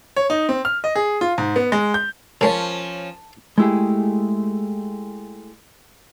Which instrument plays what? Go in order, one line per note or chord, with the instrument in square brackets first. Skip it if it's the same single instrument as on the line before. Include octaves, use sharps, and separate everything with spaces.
[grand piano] C#5
D#4
C4
F6
D#5
G#4
F4
G#2
B3
G#3
G6
[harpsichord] C#3 G#3 C#5 [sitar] F3 C#4 [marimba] A#4 [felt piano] A5
[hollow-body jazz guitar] G#3 A3 E4 G4 G#4